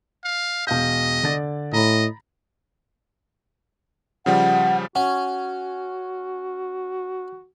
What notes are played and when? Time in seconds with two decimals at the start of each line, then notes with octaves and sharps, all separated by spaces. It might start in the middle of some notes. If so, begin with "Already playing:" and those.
0.24 F5
0.67 E1 D#5 F5 G6
1.23 D3 D5 A6
1.73 A2 D#5 A#5 B5
4.26 C#3 F3 G3 F#5
4.95 C#4 F#4 F#5